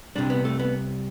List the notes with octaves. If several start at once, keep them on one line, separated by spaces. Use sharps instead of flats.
C2 C3 G3 D4
B3
A3
B3